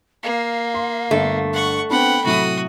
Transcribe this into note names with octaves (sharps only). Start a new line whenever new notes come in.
A#3 F5
C6
G1 D3 A3
F#5 C#6
B3 C4 D4 F#5 G5 B5
A2 C3 F#3 F#4 D#6